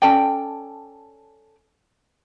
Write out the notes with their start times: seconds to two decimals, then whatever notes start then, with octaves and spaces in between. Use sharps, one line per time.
0.02 C#4 A4 D5 G5